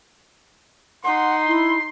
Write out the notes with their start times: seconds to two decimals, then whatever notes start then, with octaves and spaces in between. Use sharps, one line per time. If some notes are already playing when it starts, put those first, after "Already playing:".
1.05 D#4 F#5 C6
1.47 E4